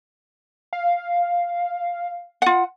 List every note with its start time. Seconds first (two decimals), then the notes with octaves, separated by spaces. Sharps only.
0.73 F5
2.42 F4 F#5